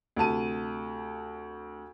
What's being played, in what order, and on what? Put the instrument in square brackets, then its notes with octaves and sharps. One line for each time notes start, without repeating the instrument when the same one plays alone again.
[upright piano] D2 C3 A5 D#7